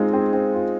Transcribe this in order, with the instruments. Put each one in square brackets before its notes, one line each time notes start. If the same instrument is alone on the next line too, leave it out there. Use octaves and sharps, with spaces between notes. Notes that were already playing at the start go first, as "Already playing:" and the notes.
Already playing: [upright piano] G#3 C4 F4 [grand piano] D#4
[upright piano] C4 [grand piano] G#4
[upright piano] C4
F4